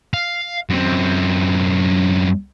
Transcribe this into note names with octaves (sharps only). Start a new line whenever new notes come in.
F5
F#2 C4